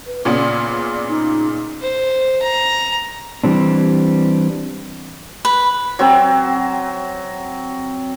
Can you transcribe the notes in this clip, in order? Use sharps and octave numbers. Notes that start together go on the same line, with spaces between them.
B4
A#2 C#3 B3 D5
D#4
C5
A#5
E3 G3 C4 D4
B4
F#3 C4